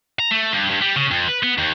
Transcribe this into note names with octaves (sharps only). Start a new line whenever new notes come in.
A#5
A3
G2
G2
G3
C#3
F2
B4
B3
D#2